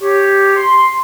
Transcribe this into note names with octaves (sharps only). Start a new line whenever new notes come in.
G4 C#5
C6